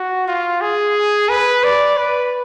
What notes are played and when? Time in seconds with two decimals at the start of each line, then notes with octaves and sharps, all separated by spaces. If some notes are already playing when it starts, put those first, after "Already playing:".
Already playing: F#4
0.28 F4
0.61 G#4
1.29 B4
1.64 D5
1.98 B4